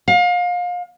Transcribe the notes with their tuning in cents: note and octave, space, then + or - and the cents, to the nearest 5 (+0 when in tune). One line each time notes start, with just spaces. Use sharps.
F5 +30